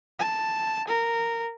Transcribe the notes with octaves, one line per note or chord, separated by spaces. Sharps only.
A5
A#4